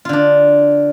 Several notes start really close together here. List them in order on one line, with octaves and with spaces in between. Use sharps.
F4 D3 D4